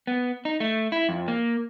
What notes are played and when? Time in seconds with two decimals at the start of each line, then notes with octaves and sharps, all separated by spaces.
0.07 B3
0.45 D#4
0.60 A3
0.92 E4
1.09 F2
1.28 A#3